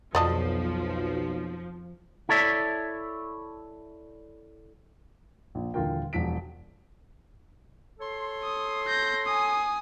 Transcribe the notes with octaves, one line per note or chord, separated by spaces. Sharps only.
B1 F2 F3 D5 D#5 A5
E4 A4 C#5 D5 E5
A#1
D#1 D3 E3 F4 A#4 G5
E1 F3 B6 D7
A4 C#5 C6
D#6
G6 A#6
G#5 D#6